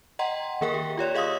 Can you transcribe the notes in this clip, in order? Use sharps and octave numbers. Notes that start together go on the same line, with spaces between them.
D#5 F#5 G5 A#5 C6
D#3 A#3 G#4 A#4 E5 G5
G4
F4 G4 C#5 D5
G#4 D#5 F5 C6 D#6 E6